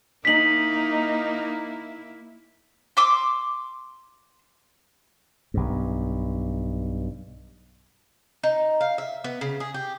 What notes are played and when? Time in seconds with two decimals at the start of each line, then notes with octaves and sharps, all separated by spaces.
0.25 A#3 D#4 E4 B6 F#7
2.97 C6 D6 E6
5.54 B1 G2
8.44 D#4
8.81 F5
8.98 E5
9.24 B3
9.41 C#3
9.60 G#4
9.74 G4